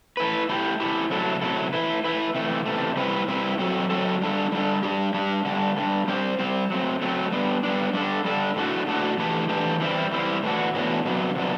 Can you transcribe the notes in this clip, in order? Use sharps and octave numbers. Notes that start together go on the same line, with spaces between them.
A3 E4 B4
A3 E4 G4
A3 E4 G4
C3 F#3 A3 E4 A4
C3 F#3 A3 E4 A4
A3 E4 B4
A3 E4 B4
C3 E3 A3
C3 E3 A3
C3 G3 C4 E4 B4
C3 G3 C4 E4 B4
F#3 C4 F#4 A4
F#3 C4 F#4 A4
G3 D4 A4
G3 D4 A4
G3 D4 G4
G3 D4 G4
D3 G3 D4
D3 G3 D4
G3 C4 G4 C5
G3 C4 G4 C5
F#3 A3 C4
F#3 A3 C4
G3 B3 D4
G3 B3 D4
G3 D4 A4
G3 D4 A4
A2 F#3 A3 D4 F#4
A2 F#3 A3 D4 F#4
E3 A3 D4 G4
E3 A3 D4 G4
E3 G3 C4 E4
E3 G3 C4 E4
A2 E3 B3 D4 F#4
A2 E3 B3 D4 F#4
C3 F#3 B3 D4
C3 F#3 B3 D4